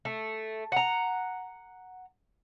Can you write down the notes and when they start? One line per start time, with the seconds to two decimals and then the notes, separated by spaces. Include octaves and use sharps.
0.05 A3
0.72 F#5 A#5